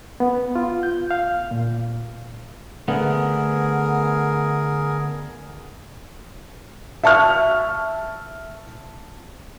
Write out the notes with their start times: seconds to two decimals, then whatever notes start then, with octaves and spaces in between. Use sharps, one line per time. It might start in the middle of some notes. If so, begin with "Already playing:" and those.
0.20 B3
0.56 F4
0.83 G6
1.11 F5
1.51 A#2
2.88 D3 A3 B3 G#4 A#4
7.04 E5 A5 C#6 F6